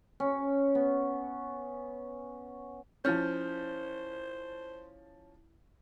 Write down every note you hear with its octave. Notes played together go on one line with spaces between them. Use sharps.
C#4
B3
F3 C#4 E4 C5 F6 G6